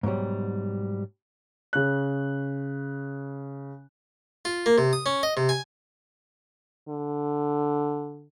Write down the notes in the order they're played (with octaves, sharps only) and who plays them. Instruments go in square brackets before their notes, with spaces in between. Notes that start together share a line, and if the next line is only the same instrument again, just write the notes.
[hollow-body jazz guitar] G#2 B2 F#3 G3
[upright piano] C#3 F#6
[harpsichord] F4
A#3
C3
D#6
C#4
D#5
C3
G#5
[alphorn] D3